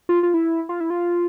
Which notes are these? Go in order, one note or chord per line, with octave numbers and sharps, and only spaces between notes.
F4
F4
E4
F4
E4
F4